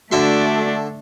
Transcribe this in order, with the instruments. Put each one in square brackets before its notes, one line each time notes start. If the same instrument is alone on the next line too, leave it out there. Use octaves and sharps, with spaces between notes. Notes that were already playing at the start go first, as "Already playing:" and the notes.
[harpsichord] D3 E5 C6 [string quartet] A3 D4 [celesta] F#4